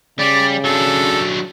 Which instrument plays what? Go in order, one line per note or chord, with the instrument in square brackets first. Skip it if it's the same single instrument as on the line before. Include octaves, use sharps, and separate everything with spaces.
[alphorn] C#3 [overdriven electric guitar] G3 [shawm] D5
[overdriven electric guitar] F#3 D4 [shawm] A4